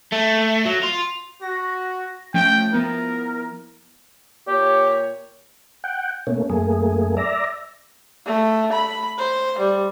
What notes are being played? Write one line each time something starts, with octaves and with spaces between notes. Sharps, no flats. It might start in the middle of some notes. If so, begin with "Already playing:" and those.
A3
F#3
F4
F#4 A#6
F3 A3 C#4 G5
F3 B3 E4 A#4
A#2 A#3 G4 C#5
F#5 G5
B2 A3 A#3 C#4
F#2 A3 A#3 G#4
D5 E5 A#5
A3
B5
C5
G3